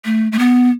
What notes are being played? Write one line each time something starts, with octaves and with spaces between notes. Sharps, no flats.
A3
A3
B3